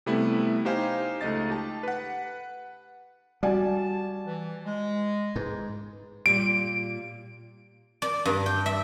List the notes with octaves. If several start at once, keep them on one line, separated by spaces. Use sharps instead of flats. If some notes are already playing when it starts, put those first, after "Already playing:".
C3 G3 A3 B3 E4
D#4 G4 C5 F5 G#5
C#2 A3 D#4 D#5 A6
G4 A5
B4 F#5
G3 F#4 D5 G#5 A5
E3
G#3
G#2 B4
A#2 G3 D7
D5
G2
G5
E5